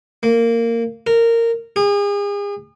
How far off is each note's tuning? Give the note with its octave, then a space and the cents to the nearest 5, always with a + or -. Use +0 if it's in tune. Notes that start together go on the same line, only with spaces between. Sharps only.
A#3 -15
A#4 -15
G#4 -40